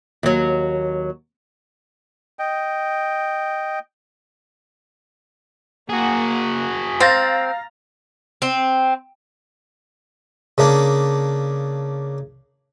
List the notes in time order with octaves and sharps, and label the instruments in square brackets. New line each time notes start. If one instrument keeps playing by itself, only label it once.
[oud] D#2 F#3
[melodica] D#5 G5
[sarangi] A#3 [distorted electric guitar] F#4 G#4
[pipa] C4 [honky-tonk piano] F5 A6 A#6 [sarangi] A#5
[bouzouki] C4
[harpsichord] C#3 A#3 D4